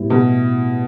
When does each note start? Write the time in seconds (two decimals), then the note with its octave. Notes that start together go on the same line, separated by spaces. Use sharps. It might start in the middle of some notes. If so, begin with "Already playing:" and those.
Already playing: A2 G3 B3 E4
0.10 B2